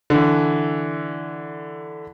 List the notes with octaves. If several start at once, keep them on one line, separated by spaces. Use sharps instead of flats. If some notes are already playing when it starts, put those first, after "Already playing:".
D3 E3